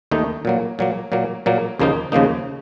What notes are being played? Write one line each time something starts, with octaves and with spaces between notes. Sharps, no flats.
D#2 D#3 A3 D#4
A#2 F#3 A#3
A#2 F#3 A#3
A#2 F#3 A#3
A#2 F#3 A#3
D#2 C#3 F3 A#3 D#4
D#2 C#3 F3 A#3 D#4